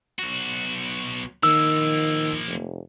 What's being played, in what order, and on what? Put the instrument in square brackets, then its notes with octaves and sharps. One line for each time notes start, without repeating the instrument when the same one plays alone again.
[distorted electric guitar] B1 F#4
[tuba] D#3 [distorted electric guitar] F3 A#3 [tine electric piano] E6
[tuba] F1